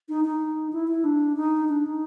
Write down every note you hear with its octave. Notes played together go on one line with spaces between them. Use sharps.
D#4
D#4
E4
E4
D4
D#4
D4
D#4